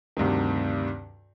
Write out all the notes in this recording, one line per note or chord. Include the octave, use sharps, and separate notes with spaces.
D2 G2 C3 D#3